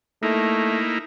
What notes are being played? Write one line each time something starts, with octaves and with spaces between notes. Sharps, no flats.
A3 A#3 D#4 E4